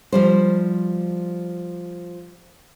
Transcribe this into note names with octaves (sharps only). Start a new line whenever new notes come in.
F3 G3 C5